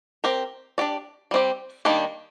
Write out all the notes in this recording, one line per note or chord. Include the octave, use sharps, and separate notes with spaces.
C4 G4 A#4
D4 G4 D5
G3 C4 G4
D#3 G3 A#3 D4 G4